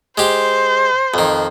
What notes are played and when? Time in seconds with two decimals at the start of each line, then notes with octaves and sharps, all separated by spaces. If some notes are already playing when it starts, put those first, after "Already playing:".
0.18 G#3 G4 C5
1.14 F2 D#3